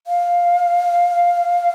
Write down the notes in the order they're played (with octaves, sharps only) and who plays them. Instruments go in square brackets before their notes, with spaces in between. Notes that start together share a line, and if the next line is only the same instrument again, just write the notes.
[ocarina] F5